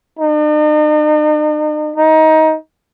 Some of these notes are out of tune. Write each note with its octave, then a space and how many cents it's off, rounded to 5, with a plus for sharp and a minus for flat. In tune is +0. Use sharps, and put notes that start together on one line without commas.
D#4 -45
D#4 +20